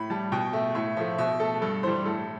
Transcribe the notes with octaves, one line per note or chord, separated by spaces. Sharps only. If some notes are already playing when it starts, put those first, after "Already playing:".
Already playing: A2 B5
G3 A5
B2 G5
A3 E5
A2 E5
F3 A3 E5
B2 E5
A3 A4
G2 A4
E3 G3 C5
A2 A4